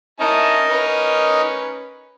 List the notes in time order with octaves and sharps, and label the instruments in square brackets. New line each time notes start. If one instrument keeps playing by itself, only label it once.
[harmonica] C#4 E4 A5 [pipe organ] D#4 A#4 D#5
[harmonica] C#4 B4